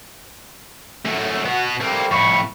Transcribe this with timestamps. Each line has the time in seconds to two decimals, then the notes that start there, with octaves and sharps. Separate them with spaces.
1.06 F#2 A3
1.46 B2 B3 F#4
1.81 G3 A3 A#3 C4
2.11 F2 A2 B5 C#6